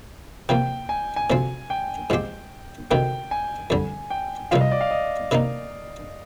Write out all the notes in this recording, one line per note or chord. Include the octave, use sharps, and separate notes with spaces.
C3 F3 A#3 G5
G#5
G#5
D2 C3 F3 C4
G5
G#2 F3 C4 G4
D2 C3 D#3 G5
G#5
F2 D3 G3
G5
C2 C3 F3 C4 F4 F5
D#5
D5
F5
D#5
C3 D#3 A#3 D#4